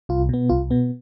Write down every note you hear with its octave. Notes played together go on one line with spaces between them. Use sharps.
C2 F4
B2 B3
C2 F4
B2 B3